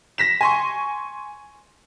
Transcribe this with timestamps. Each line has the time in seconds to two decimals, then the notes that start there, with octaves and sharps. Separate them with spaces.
0.18 A#6 B6 E7
0.41 G#5 C6 C#6